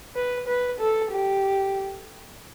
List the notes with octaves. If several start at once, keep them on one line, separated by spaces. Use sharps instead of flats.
B4
B4
A4
G4